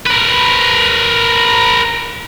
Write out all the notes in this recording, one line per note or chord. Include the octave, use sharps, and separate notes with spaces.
A#4 B4